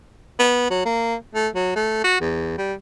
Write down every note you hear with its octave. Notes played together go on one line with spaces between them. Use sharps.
B3
F#3
A#3
A3
F#3
A3
F#4
E2
G3